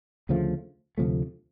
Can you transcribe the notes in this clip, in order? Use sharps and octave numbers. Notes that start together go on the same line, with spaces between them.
D2 C#3 F3 A3
D2 C3 F3 A3